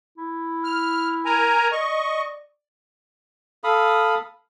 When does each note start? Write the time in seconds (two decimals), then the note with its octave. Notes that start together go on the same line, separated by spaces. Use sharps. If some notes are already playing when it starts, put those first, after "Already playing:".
0.17 E4
0.64 F6
1.25 A#4 G#5 A#5
1.72 D5 D#5 C#6
3.64 A4 F5 B5 D#6